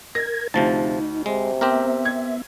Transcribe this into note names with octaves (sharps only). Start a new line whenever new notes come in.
A#4 G#6 A#6
D2 C3 F3 D#4 A5
C3 G#3
B3 C4 G4 A#4 E5
G#6